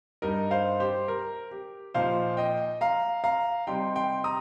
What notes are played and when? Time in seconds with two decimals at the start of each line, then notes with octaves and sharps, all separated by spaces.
0.22 G2 G3 D#4 A#4 D#5
0.51 C5 F5
0.80 G4 C5
1.08 A#4
1.51 G4
1.94 A#2 F3 D#4 C5 F5
2.37 D#5 G5
2.81 F5 A#5
3.24 F5 A#5
3.67 C3 G3 D#4 G5 C6
3.96 G5 C6
4.24 A#5 D#6